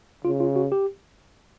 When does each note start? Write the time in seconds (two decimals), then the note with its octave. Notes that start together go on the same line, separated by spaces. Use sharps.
0.25 C#3 F4
0.40 F4
0.56 F#4
0.72 G4